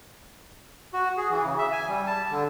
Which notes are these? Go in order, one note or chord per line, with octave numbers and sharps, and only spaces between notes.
F#4
G#4
E3
C#3
E5
G#5
G3
A5
D3